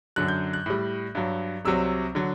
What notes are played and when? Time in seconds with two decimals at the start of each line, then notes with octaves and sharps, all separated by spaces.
0.16 F#2 D3 F#3 F#6
0.28 G6
0.53 F#6
0.66 A2 G3
1.15 G2 F#3
1.65 C2 C3 F#3 E6
2.15 D3 F#3